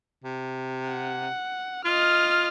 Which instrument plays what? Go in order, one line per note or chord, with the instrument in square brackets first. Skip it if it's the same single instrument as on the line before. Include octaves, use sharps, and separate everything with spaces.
[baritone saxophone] C3
[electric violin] F#5
[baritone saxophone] F4 [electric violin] D#5 F6